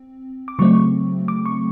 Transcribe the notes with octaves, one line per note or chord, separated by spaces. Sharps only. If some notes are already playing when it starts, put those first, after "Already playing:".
Already playing: C4
D6
C#3 F#3 A3 C4 C#6
D6
C#6